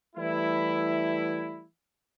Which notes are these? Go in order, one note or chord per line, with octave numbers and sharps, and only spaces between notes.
E3 G3 A3 E4